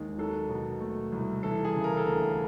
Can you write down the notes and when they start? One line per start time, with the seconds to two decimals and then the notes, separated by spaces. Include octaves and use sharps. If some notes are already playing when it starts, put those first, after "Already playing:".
Already playing: D#2 G#3
0.18 F#3 A4
0.49 B2
0.81 A3
1.12 C2
1.43 E3 A4
1.64 G#4
1.74 C#3
1.84 A#4
1.97 A4
2.05 D2 A#4